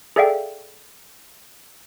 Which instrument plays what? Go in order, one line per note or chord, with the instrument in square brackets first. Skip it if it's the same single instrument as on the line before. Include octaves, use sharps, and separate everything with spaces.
[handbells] G#4 A4 D5 E5 F5 G5